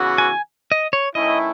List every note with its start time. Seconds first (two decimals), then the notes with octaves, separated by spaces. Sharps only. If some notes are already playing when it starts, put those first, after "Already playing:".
Already playing: C#3 E3 B3 F#4
0.18 G#5
0.72 D#5
0.93 C#5
1.15 D#3 A3 C#4 E4 D#5